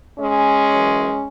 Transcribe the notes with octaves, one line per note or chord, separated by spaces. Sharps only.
G#3 C#4
F#2 E3